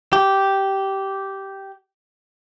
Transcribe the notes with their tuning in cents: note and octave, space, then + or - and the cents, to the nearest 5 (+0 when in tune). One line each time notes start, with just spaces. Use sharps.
G4 -10